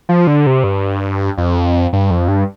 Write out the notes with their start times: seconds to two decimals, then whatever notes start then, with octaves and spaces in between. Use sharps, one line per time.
0.09 F3
0.27 D3
0.47 C3
0.64 G2
1.38 F2
1.93 G2
2.11 F2
2.28 G2